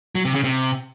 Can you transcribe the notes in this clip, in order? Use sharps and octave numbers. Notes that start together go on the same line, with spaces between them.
F#3
C3
C#3
C3